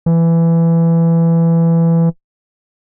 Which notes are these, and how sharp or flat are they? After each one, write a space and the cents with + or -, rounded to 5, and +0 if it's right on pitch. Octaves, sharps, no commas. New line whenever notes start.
E3 +15